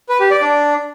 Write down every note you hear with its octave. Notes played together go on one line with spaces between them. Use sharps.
B4
G4
D5
D4